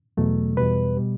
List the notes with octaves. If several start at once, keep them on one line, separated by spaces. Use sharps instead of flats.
E2 B2 F#3 A3
E2 B2 G3 B4
B2 G3